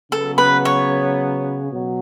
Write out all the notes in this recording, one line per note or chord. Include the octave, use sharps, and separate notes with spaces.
C#3 F#3 B3 A4
B4
C#5
B2 F#3